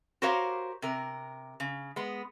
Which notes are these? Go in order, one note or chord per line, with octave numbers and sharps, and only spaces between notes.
F#4 G4 A#4 C5 C#5 F5
C3 A#4
C#3
G#3 B3